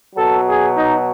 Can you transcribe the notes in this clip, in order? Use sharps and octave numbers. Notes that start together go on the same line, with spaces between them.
B2 F#3 A4
G#4
D#4